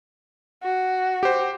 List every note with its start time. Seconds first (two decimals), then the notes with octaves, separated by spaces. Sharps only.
0.63 F#4
1.23 G4 C5